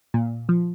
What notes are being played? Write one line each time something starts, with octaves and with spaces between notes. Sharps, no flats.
A#2
F3